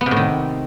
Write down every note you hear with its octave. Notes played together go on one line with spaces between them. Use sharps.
B3
C3
A2
D#3